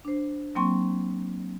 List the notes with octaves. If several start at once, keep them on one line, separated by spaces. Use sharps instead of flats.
D4 C5
F#3 A#3 C4 G5 C6 C#6